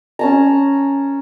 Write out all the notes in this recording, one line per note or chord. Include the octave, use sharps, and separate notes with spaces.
C#4 A5 A#5